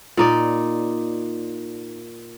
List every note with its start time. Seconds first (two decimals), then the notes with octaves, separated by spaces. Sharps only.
0.17 A#2 D#4 D5